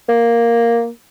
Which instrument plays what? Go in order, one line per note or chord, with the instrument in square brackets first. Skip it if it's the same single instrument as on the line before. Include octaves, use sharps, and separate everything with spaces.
[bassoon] A#3